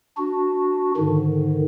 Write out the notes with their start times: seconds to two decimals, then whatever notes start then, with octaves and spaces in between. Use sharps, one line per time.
0.18 D4 F#4
0.97 G#2 D3 D#3